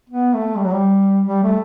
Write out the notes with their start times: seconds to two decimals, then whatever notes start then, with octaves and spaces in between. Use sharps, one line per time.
0.10 B3
0.34 A3
0.56 G3
0.64 F#3
0.72 G3
1.26 G3
1.44 A3